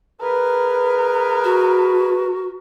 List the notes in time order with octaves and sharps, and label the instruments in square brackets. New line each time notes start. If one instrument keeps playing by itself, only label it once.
[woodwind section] E3 G#4 B4 [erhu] A#4
[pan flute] F#4